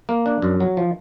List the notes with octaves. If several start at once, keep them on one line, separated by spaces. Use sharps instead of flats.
A#3
D4
F#2
F#3
F3